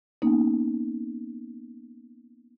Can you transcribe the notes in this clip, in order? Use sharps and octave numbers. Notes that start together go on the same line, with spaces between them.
A#3 B3 C#4 D#4